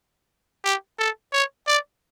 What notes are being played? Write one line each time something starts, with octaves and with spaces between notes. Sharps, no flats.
G4
A4
C#5
D5